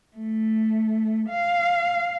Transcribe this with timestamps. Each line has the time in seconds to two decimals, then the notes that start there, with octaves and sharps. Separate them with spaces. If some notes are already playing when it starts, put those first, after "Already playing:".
0.17 A3
1.29 F5